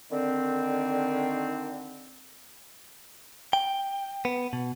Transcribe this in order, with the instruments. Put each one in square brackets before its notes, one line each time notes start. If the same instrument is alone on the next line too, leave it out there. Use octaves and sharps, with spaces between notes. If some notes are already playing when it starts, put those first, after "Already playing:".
[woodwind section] D3 D#3 C4
[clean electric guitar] G5
B3
B2